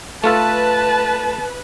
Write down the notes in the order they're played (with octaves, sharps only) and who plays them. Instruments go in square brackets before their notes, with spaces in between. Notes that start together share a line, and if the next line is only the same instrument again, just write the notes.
[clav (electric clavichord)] A3 F4 A4 [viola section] B4 [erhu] A5